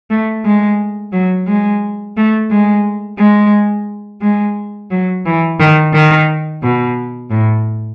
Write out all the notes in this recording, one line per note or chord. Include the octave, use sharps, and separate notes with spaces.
A3
G#3
F#3
G#3
A3
G#3
G#3
G#3
F#3
E3
D#3
D#3
B2
A2